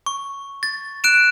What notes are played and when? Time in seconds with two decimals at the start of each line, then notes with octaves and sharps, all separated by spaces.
0.06 C#6
0.63 A6
1.04 F#6 D7 E7